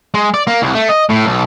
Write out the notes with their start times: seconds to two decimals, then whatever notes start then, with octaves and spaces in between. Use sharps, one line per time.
0.14 G#3
0.34 D5
0.47 A#3
0.62 C2
0.74 A3
0.89 D#5
1.09 A2
1.25 B1